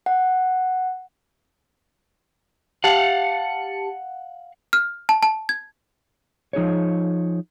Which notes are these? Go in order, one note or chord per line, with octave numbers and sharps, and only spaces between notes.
F#5
G4 F5 F#5 A5 C#7
F6
A5
A5
G#6
F3 D#4 G#4 C#5